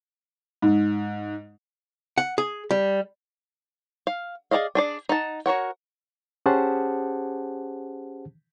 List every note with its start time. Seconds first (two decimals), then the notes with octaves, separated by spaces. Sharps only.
0.62 G#2
2.18 F#5
2.38 G#4
2.71 G3
4.07 F5
4.51 G#4 A#4 D5 D#5 F5
4.75 D4 G#4 D5
5.09 D#4 F#5 A5
5.46 F#4 A#4 C#5 F#5
6.46 C#4 G4 G#4 C5 F#5 A5